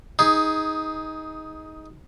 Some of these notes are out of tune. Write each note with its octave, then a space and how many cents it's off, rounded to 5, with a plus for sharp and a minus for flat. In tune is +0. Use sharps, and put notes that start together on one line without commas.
D#4 +15 G#4 +0